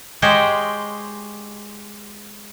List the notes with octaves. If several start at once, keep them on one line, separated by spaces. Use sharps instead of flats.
G#3 G4 C5 C#5 D#5